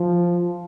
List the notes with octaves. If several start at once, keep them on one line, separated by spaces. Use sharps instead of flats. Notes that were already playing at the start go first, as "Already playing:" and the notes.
Already playing: F3